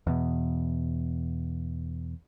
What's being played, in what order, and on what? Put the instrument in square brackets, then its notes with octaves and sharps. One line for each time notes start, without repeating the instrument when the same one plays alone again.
[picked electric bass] E2 B2